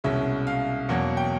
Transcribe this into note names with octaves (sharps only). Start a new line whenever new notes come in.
C2 B2 G#3 C#4 E5
F5
E2 B2 F#3 A#3 F#5
G5